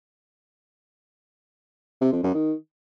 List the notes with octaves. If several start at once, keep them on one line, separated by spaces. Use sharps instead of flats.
C3
F2
F#2
D#3